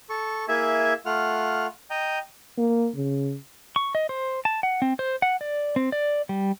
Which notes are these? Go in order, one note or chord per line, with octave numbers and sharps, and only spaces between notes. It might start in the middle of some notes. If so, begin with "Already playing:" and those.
A4 C#6
A#3 E4 G#4 E5 G#5
A3 F4 F#5 F6
D#5 G5 A#5
A#3
C#3
C#6
D#5
C5
A5
F#5
C4
C5
F#5
D5
C4
D5
G3